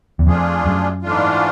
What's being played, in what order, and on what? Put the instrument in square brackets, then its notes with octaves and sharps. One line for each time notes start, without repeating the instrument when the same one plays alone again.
[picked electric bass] E2
[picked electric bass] F2 [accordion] F3 A3 D4 F4 G#4
[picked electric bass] F#2
[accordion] G#2 E3 A3 D4 F4